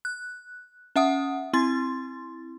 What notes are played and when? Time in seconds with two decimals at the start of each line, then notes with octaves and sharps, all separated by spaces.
0.05 F#6
0.96 C#4 E5 F#5 D#6
1.53 C4 E4 C6 A6